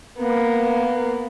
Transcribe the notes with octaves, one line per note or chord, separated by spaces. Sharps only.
A#3 B3